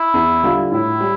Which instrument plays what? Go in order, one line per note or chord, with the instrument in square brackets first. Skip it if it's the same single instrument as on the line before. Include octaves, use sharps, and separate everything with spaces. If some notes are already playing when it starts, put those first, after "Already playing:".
Already playing: [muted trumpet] E4
[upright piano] E2
D3 G3 D4 F4
[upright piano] A2 [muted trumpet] E4
[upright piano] G3